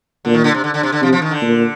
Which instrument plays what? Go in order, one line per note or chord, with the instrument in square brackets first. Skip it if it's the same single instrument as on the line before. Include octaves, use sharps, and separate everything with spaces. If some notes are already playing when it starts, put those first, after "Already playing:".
[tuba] A#2 [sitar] D3
[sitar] D#3
D3
C3
D3
D3
C3
D3
[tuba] C3 [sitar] F3
[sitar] F3
D#3
D3
[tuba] A#2